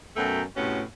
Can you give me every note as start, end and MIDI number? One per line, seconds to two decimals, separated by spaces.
0.17 0.42 42
0.17 0.42 47
0.17 0.42 54
0.17 0.42 57
0.17 0.42 79
0.17 0.42 82
0.56 0.81 45
0.56 0.81 48
0.56 0.81 59
0.56 0.81 61
0.56 0.81 66